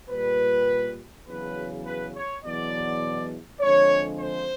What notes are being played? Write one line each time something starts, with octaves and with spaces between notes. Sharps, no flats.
A#2 G3 B4
E2 C#3 F#3 B4
B4
C#5
E2 B2 F#3 D5
F2 D3 F3 G#3 C#5
C5